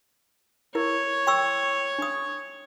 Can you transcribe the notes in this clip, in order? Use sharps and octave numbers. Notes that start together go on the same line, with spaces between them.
E4 A#4 C#5
G5 C#6 E6
D4 D#6